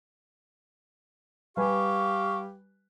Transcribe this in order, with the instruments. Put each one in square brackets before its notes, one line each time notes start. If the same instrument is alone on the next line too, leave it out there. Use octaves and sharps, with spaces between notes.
[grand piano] G3 B4 G#5 [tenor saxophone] G4 [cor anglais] F5 [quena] C#6